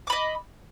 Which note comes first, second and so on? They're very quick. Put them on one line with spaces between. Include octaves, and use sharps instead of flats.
D6 B5 D#5